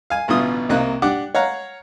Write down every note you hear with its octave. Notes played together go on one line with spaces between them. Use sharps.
F5 G#5
A1 B2 D3 E3 F4 D#6
C2 C3 A#3 D#5 F#6
D4 G4 F#5 D6
C#5 F5 F#5 A#5